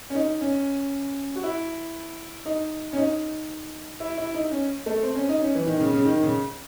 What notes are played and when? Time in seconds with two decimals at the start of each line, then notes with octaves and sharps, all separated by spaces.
0.10 C#4
0.15 D#4
0.41 C#4
1.36 F#4
1.43 E4
2.45 D#4
2.93 C#4
2.97 D#4
4.00 E4
4.17 E4
4.35 D#4
4.52 C#4
4.86 A3
5.03 C4
5.15 C#4
5.29 D#4
5.41 C#4
5.55 E3
5.67 D#3
5.80 C#3
5.93 C#3
6.05 D#3
6.23 C#3